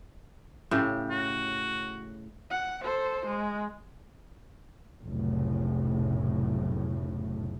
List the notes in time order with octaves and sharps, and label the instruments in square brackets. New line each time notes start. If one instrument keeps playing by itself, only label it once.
[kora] A2 C#3 G4
[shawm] F#4
[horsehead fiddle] F#5
A4 C5
G#3
[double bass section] F1 B1 A2 C#3